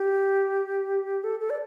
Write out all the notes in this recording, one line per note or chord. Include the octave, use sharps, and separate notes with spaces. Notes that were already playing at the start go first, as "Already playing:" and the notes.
Already playing: G4
A4
A4
D5